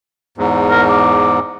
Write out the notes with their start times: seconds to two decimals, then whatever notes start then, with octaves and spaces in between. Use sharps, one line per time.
0.38 E2 G#2
0.70 A#4
0.89 D6